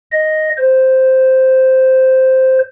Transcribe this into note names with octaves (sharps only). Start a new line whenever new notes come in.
D#5
C5